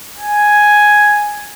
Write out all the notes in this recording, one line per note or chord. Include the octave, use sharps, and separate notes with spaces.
G#5